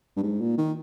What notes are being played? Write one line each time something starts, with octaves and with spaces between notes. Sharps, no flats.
G2
G#2
A#2
D#3